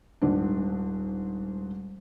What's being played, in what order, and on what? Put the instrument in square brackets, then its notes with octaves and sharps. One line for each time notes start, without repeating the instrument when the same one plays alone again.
[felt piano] D#1 G#2 D4